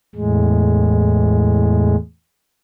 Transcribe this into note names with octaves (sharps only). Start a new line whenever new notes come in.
E2 A2 G#3